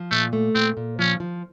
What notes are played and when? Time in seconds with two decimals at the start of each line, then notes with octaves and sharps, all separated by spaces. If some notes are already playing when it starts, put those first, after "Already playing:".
Already playing: F3
0.11 A#2 A3
0.33 A3
0.55 A#2 C4
0.77 A#2
0.99 F3 C#4
1.20 F3